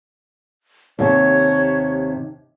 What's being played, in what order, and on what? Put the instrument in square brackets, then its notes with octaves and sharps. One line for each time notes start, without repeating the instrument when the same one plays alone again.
[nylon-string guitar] D#2 C3 [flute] C#5